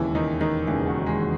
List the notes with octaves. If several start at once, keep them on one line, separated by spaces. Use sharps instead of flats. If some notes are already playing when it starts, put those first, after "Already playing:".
Already playing: E1 D#2 C#3 E3 E4
D#3 D#4
D#3 D#4
E1 D#2 C#3 E3 E4
F#3 F#4
G#3 G#4